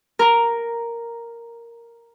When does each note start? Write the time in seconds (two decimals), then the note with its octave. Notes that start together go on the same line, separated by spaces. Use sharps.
0.19 A#4 A#5